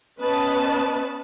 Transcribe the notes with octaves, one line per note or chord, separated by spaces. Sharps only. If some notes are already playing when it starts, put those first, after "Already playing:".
B3 C#4 B4 D#5 A5